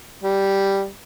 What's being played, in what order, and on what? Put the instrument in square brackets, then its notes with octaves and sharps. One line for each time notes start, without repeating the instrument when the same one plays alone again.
[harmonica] G3